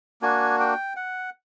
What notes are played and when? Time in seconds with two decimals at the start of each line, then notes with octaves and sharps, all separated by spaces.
0.22 A#3 D4 F#4 G#5
0.60 G5
0.96 F#5